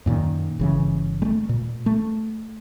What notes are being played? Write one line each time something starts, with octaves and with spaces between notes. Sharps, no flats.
F#2 A#2 D3 D#3
G1 C#3 E3
G#3 A3
A#2
A3